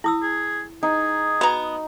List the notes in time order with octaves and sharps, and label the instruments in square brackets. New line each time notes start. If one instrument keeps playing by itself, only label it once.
[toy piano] E4 D#6 E6
[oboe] G#4
[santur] D#4 [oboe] G#4
[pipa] B3 A#5 [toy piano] F#4